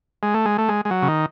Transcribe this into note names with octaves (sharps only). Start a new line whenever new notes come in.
G#3
A3
G#3
A3
G#3
G#3
F#3
C#3
D#3